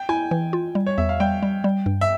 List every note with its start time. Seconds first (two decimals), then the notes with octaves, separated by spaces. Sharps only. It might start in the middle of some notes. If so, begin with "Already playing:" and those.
Already playing: G5
0.09 E4 G#5
0.31 E3
0.53 F4
0.75 G3
0.86 C#5
0.98 E2 E5
1.09 F5
1.20 G3 G5
1.42 G3
1.64 G3
1.86 G2
2.01 E5